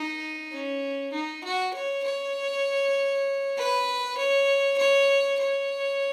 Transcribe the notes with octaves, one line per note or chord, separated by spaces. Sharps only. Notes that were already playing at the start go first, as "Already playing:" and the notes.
Already playing: D#4
C#4
D#4
F#4
C#5
C#5
B4
C#5
C#5
C#5